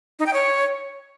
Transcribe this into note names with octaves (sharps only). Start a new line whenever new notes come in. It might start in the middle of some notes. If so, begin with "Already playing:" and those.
D#4
G5
C#5